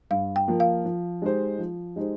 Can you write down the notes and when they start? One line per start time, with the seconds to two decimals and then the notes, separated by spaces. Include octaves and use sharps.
0.11 G2 F5
0.36 G5
0.48 F3 A#3
0.60 F5
0.85 F3
1.22 G#3 D#4 G4 C5
1.59 F3
1.96 G#3 D#4 G4 C5